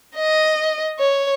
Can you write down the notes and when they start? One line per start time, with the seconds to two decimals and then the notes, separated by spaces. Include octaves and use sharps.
0.16 D#5
0.99 C#5